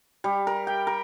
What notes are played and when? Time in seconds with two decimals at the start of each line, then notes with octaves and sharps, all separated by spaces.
0.24 G3
0.47 A#4
0.67 G5
0.87 A#4